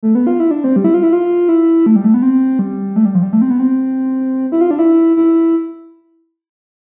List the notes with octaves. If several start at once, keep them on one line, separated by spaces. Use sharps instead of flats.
A3
B3
F4
E4
D4
C4
G3
E4
F4
E4
F4
E4
A3
G3
A3
B3
C4
G3
A3
G3
F3
G3
A3
C4
B3
C4
E4
F4
D4
E4
E4